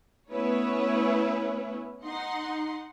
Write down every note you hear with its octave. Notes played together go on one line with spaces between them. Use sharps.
A3 B3 C#4 E4 B4 C#5
D#4 F#5 C6